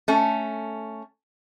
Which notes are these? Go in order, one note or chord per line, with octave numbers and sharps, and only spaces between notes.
A3 C#4